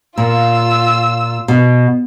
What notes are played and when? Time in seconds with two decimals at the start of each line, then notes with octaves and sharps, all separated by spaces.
0.18 A#2 F4 E6
1.48 B2